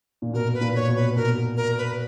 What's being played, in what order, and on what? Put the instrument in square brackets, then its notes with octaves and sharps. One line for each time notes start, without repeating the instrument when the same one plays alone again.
[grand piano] A#2
[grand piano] B2 [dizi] A#4
[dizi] B4
[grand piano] A#2
[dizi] C#5
[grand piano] B2
[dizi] B4
[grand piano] B2 [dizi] A#4
[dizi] A#4
B4